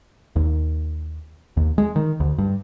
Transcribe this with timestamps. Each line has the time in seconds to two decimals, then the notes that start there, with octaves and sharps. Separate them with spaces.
0.36 D#2
1.57 D#2
1.78 G#3
1.96 D#3
2.20 D2
2.38 G2